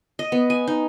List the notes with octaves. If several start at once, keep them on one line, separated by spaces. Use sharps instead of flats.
D#5
B3
G#5
D#4